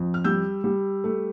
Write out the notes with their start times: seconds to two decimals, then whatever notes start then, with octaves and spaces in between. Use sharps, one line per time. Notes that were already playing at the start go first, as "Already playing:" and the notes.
Already playing: F2
0.14 F6
0.24 G3 E6 G6
0.64 G3
1.04 A3